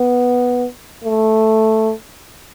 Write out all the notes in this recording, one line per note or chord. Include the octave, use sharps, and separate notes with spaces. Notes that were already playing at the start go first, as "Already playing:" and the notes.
Already playing: B3
A3